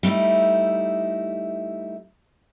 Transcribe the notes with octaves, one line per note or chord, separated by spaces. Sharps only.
G3 A3 D#4 E4